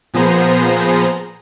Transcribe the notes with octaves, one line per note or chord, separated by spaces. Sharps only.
A#2 F3 B3 G#4 C5 A#5